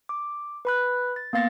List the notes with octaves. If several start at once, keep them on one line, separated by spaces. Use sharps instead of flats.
D6
B4 B5 F#6
A6
A#3 B3 F5 A6 A#6